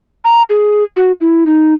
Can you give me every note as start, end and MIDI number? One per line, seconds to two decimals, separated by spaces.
0.24 0.42 82
0.50 0.83 68
0.96 1.12 66
1.21 1.44 64
1.46 1.73 63